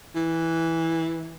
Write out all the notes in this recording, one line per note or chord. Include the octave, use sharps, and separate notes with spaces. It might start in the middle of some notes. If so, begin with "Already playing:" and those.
E3